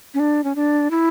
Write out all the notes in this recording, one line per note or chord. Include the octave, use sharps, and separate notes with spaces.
C#4
D4
C#4
D4
E4